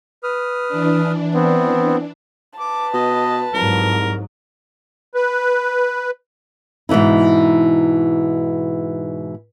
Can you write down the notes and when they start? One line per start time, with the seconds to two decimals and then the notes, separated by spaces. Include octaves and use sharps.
0.23 B4 D#6 F6
0.69 E3 D4
1.34 B3 C4
2.59 B4 A5 D6
2.94 B2 D#5
3.54 C2 G#2 F#3 A#4
5.15 B4
6.89 G#2 B2 E3 D#4 E4